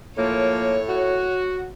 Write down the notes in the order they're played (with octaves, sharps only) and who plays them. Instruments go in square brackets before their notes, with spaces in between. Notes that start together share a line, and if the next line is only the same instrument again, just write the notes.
[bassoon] A2 [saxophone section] F3 A#3 [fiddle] C#5
[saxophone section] F#4